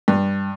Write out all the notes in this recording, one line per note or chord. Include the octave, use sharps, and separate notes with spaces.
G2